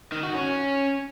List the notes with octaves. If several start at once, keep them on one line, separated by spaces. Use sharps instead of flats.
D#3
F#4
C#4